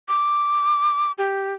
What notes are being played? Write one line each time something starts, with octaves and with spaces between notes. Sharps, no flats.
D6
G4